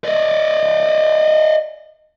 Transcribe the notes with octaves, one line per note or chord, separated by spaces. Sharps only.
D5 D#5